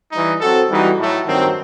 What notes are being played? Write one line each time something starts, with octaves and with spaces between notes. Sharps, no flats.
E3 G3 D#4
F#3 C4 F#4 A4
E3 G3 D#4 F#4
A2 F#3 A3
G2 D#3 F#3 C4